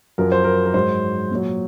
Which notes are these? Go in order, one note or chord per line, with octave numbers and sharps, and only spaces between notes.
F#2 F3 A#4
C5
A#4
A#4
G#2 F#3 C5
A#2 F#3